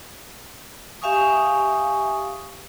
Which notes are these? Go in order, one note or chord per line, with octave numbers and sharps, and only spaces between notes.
G4 E5 F5 G#5 C#6 D#6